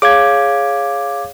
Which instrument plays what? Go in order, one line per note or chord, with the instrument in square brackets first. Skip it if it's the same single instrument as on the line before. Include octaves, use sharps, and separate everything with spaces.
[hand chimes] G#4 C#5 F5 [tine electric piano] D6 G#6